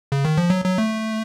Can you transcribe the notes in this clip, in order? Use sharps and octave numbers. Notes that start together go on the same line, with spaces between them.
C#3
D#3
F3
F#3
F#3
A3